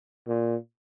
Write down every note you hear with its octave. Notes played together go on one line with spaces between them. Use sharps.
A#2